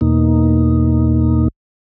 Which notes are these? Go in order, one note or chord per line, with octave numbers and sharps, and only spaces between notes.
E2 B2 A#3 D#4